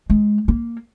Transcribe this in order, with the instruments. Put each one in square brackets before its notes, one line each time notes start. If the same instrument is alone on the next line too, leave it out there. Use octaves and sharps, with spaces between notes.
[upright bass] G#3
A#3